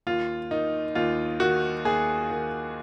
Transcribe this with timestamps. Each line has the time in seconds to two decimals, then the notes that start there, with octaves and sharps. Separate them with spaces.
0.07 D#2 F4
0.51 D#3 D#4
0.95 D#2 F4
1.40 D#3 F#4
1.85 D#2 G#4
2.30 D#3